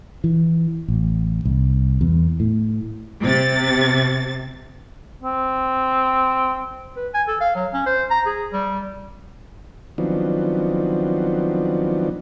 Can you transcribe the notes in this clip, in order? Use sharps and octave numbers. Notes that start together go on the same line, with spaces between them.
E3
A1
C2
E2
A2
C3 A6
C4
B4
G#5
A4
F5
F#3
C#4
C5
A#5
G#4
G3
D#3 F3 F#3 B3 C4 D4